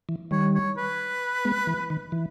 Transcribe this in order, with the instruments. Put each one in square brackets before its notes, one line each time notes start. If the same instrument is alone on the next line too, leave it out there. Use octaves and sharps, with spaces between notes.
[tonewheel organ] E3
[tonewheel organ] D#3 G3 [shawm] C#5
[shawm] C#5
B4
[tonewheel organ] G#3 B3
E3
D#3
E3